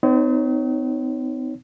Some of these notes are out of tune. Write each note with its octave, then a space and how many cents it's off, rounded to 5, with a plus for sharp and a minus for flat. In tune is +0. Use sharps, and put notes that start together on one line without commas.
C4 -45 D#4 +0 C#5 +5